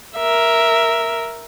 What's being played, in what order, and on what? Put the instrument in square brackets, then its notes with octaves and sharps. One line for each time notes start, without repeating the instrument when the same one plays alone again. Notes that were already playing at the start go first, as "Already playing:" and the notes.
[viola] A#4 E5